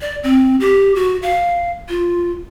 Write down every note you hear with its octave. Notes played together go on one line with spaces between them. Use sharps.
D5
C4
G4
F#4
F5
F4